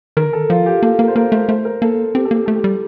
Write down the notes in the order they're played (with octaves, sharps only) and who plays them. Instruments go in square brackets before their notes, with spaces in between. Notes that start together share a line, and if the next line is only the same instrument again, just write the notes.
[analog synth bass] D#3 [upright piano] A#4
[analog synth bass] D3
[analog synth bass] D#3 [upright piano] A4
[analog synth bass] F3 [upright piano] F4
[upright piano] G4
[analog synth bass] A#3 [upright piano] A4
[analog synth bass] A#3 [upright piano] A#4
[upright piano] C5
[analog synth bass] A#3 [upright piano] A#4
[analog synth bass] A3 [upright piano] C5
[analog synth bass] A3 [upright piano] C5
[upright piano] A#4
[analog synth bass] A#3 [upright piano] A4
[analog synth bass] C4 [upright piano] G4
[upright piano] A4
[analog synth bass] A#3 [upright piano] G4
[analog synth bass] A3 [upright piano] A4
[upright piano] G4
[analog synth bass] G3